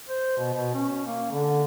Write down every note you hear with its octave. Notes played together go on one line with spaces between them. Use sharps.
C5
B2
B2
C#4
A#3
D3